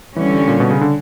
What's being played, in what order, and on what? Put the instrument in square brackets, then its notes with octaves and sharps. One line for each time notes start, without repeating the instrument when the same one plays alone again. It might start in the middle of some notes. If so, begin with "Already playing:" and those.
[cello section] D3 G3 C#4 [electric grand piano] E3
[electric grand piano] A#2
B2
C#3
D3